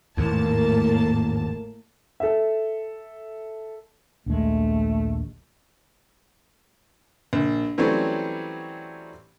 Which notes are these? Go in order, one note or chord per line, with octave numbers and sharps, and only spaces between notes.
G#1 E2 A2 A#3 A5
A4 E5
A#1 D#2 G#3 A3
A#1
E3 F#3 G3 A3 C4 C#4